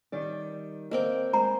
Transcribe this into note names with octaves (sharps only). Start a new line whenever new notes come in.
D#3 G3 D5
A#3 C4 D#5 G5
G#3 C5 A#5